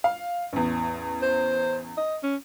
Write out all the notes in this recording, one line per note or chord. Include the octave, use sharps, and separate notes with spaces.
F5
A1 E2
C5
D#5
C#4